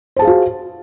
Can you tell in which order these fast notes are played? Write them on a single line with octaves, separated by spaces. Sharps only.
C5 A5 G#4 F5 F#4